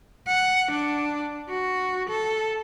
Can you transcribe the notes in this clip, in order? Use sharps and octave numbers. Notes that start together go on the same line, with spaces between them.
F#5
D4
F#4
A4